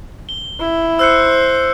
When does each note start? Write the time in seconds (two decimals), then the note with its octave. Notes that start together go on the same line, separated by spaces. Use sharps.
0.29 G7
0.60 E4
0.99 C5 E6 F#6 C#7